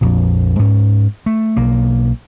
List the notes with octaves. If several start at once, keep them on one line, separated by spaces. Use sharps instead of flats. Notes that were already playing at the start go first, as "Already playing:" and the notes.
A#1 F2 A#2
G#2 C#4
A3
B1 A#3